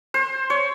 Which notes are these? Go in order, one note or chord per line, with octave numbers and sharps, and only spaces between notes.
C5
C#5